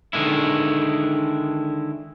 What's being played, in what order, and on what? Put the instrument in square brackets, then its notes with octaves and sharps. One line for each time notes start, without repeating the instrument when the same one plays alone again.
[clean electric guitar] D3 D#3 G#3 E4